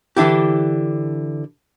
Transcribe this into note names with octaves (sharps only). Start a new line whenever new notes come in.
D3 E3 D4 E4 G4